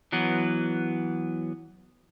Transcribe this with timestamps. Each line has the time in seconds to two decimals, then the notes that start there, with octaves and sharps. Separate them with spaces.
0.12 E3 F#3 B3